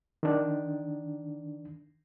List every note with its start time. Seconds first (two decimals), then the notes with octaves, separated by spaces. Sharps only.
0.23 D#3 D4